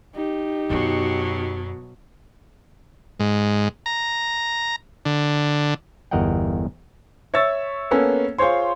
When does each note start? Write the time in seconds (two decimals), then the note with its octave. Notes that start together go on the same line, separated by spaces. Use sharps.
0.15 D#4 G4
0.70 F#2 B2 F#3 B3
3.20 G#2
3.86 A#5
5.05 D3
6.11 G1 E2 A#4 D#5 F#5 G5
7.34 C#5 E5 C#6 E6 A6
7.91 A#3 B3 C#4 A4
8.39 F4 G#4 C5 C#5 C6